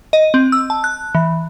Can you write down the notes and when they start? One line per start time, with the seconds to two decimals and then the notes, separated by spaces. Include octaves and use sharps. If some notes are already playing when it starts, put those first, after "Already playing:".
0.13 D#5
0.34 C4
0.52 E6
0.70 A5
0.84 F#6
1.15 E3